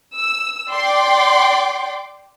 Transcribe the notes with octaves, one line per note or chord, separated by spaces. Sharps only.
E6
D5 G5 C6 D6